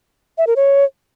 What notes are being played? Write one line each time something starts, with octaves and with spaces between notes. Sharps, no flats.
E5
A#4
C#5